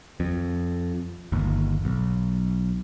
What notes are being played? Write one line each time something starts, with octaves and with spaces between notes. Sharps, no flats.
F2
G1 D#2
B1